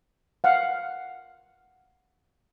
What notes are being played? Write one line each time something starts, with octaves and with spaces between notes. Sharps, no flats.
F5 F#5